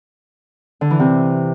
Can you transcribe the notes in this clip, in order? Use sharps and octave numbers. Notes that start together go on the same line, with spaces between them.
D3
E3
C3